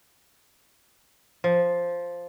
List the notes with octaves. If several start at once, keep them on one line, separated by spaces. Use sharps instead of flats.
F3